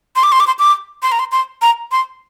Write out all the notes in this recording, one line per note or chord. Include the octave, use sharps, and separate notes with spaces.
C6
D6
C6
D6
C6
D6
C6
A#5
C6
C6
A#5
C6